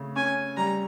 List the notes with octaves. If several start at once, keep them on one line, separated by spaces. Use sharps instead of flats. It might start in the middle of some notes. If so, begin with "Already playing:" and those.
Already playing: C#3 A3
C#4 G#5
G3 A#5